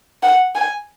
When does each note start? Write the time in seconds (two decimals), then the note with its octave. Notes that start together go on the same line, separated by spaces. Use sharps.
0.23 F#5
0.55 G#5